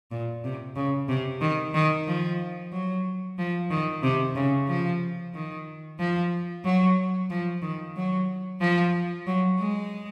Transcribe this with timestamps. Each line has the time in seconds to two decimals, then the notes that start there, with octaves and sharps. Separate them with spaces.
0.11 A#2
0.44 C3
0.76 C#3
1.09 C3
1.42 D#3
1.74 D#3
2.07 F3
2.73 F#3
3.39 F3
3.70 D#3
4.03 C3
4.36 C#3
4.68 F3
5.35 D#3
6.00 F3
6.65 F#3
7.30 F3
7.63 D#3
7.96 F#3
8.61 F3
9.27 F#3
9.59 G#3